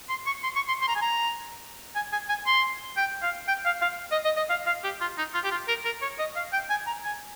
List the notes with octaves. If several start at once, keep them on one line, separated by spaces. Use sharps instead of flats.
C6
C#6
C6
C#6
C6
C6
A#5
G#5
A#5
G#5
G#5
G#5
C6
G5
F5
G5
F5
F5
D#5
D#5
D#5
F5
F5
G4
F4
D#4
F4
G4
F4
A#4
A#4
C#5
D#5
F5
G5
G#5
A#5
G#5